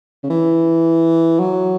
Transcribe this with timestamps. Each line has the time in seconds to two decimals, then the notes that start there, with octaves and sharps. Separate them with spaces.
0.23 C#3
0.30 E3
1.40 F#3